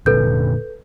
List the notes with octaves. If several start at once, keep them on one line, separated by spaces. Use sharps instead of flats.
F1 A#2 D3 A4 B4 G6